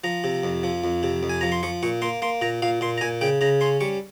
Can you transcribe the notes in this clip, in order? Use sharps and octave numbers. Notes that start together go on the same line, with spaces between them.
F3 A#5
C3
F2
F3
F2
C3
F2
G#5
F3 A#5
C6
F3 C#6
A#2 C#6
A#3 C6
A#3 C6
A#2 A#5
A#2 F5
A#2 C6
A#5
A#2 G#5
C#3 G5
C#3 A#5
C#4 C6
G3 C#6